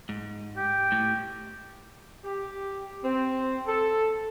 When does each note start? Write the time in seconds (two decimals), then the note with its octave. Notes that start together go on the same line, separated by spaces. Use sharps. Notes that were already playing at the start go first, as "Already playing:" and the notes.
0.09 G#2
0.57 G4
0.92 A2
2.25 G4
3.04 C4
3.67 A4